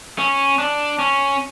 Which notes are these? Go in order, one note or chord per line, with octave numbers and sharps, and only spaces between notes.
C#4
D4
C#4